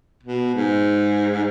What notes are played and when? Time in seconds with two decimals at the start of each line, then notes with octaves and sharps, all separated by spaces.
0.23 B2
0.55 G#2